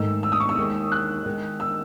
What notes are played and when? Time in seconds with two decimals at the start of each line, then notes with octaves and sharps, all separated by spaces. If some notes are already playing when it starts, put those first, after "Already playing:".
Already playing: G#2 D#3 A3 D#4 E6
0.23 E6
0.32 D#6
0.40 C#6
0.49 E6
0.57 D#2 D#3 G#3
0.92 F#6
1.26 D#3 G#3 D#4
1.60 E6